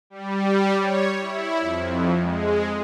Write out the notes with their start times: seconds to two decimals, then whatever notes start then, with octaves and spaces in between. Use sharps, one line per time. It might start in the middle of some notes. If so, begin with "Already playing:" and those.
0.10 G3
0.77 C#5
1.21 E4
1.61 F2
2.20 G#3